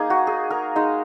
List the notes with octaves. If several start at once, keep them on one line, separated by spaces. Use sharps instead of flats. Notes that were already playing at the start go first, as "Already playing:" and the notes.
Already playing: A#3 D#4 G#4
F#4
G#4
A#4
G#3 D#4